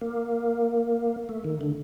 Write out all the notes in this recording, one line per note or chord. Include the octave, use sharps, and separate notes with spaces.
A#3
A3
D#3
D3